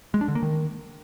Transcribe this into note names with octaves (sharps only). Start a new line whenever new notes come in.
G#3
D4
D3
A#3
D#3